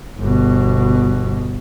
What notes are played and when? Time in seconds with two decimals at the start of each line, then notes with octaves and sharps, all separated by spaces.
0.19 G1 B2